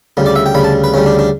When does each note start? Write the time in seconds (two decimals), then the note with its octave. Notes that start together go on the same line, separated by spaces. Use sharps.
0.17 D2 C#3 G3
0.26 D5
0.36 E5
0.46 G5
0.54 D2 C#3 G3 B5
0.64 A5
0.84 B4
0.94 D2 C#3 G3 C#4
1.06 D4
1.19 D4